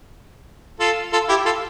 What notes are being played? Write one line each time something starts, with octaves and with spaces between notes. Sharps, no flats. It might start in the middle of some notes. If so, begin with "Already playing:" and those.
F4 A4
F4 A4
E4 G4
F4 A4